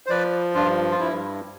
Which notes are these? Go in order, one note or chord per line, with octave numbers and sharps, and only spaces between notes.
C5
F3 B4 D5
G2 D4 F4
F4
G2 E4